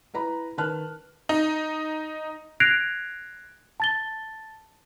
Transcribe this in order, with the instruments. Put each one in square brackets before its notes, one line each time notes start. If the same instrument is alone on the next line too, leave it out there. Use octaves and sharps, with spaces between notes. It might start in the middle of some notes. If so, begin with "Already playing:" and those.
[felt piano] E4 B4 A#5 B5
D#3 B4 A5 F6 F#6
[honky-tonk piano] D#4
[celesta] F#6 G#6 A#6 C7 D7 F7
A5 A6 G7